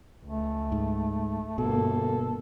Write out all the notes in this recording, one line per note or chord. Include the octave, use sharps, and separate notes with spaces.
C#2 A3
G#2
G1 B2 A#3 A4